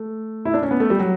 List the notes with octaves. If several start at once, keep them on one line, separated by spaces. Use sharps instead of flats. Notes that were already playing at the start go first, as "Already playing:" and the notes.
Already playing: A3
E4
D4
C#4
B3
A3
G3
F#3